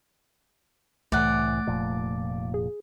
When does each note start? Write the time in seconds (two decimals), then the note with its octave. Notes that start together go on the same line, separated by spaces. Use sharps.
1.12 C2 A2 E3 A3 D5 F#5
1.67 F1 A#2 F3
2.54 G#4